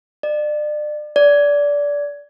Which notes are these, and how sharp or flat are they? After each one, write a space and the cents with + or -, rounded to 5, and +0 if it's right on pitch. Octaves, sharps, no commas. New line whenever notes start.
D5 +35
D5 -20